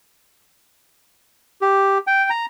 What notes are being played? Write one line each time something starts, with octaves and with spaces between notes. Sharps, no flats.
G4
G5
A#5